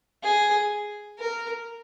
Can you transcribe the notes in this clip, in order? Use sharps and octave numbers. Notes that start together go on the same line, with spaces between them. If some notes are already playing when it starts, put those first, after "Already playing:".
G#4
A#4